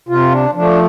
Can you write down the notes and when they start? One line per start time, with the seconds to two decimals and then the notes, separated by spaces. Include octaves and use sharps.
0.08 C3 F4
0.31 D4
0.55 F3 A3 D4